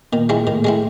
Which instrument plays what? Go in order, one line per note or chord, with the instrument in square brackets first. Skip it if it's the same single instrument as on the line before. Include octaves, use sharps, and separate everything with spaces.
[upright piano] A#2 [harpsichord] D#3
[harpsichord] G#3 C4 E4
[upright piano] A2 [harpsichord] D#3
[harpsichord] G#3 C4 E4